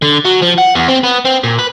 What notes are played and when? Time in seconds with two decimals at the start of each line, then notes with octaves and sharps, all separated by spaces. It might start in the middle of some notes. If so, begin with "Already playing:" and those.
0.02 D3
0.25 F#3
0.42 F3
0.58 F#5
0.75 E2
0.88 C4
1.04 B3
1.25 C4
1.44 A#2
1.59 B4